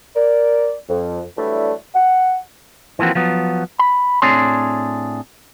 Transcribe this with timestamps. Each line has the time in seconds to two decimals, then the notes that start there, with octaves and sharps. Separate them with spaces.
0.16 A#4 D5
0.89 F2
1.37 E3 F#3 G3 A3 D4 E4
1.95 F#5
2.99 E3 F3 A#3 C4 F#4
3.15 F3 F#3 B3
3.79 B5
4.22 A2 C4 D4 G#4 C#5 C6